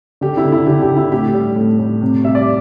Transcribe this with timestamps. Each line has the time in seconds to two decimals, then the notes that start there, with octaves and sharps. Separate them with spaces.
0.21 D3 G4
0.37 E4
0.44 D3
0.52 E4
0.67 D3 G4
0.82 G4
0.90 D3
0.97 E4
1.12 A2 G4
1.34 G3
1.56 A2
1.79 A2
2.01 C3
2.24 G3 E5
2.35 D5